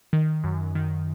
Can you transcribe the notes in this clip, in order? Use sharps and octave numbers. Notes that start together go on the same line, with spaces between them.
D#3
F#2
D#3